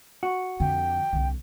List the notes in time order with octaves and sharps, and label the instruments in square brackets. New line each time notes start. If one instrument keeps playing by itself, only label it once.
[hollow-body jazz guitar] F#4
[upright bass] F2 D3 [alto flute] G5
[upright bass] C2 D3